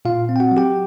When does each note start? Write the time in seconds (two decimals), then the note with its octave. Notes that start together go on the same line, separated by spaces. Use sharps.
0.05 A#2 F4 F5
0.29 C4
0.36 G5
0.40 F#4 F#5
0.52 F#3
0.57 G4 G5